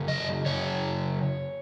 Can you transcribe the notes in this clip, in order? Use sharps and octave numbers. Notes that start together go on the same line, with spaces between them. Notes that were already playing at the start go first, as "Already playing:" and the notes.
Already playing: F#2 C#3
D#5
F#2 C#3 C#5